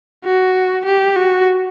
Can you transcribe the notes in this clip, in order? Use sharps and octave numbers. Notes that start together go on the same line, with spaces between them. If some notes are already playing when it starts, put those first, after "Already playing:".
F#4
G4
F#4